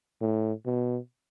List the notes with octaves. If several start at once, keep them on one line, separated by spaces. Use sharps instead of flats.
A2
B2